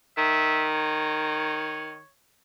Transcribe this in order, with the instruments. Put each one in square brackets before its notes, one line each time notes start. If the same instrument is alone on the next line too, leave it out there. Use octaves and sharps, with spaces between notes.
[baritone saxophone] D#3 [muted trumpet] E5
[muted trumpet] C#5